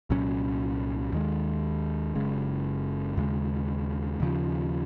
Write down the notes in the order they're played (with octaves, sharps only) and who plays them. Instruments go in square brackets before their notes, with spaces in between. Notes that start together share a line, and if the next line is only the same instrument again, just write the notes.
[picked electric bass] C2 A#2 F#3 C#4
D#2 D#3 G#3
F#1 F#2 C#3 G#3
D#2 C#3 G#3
D#2 C#3 F3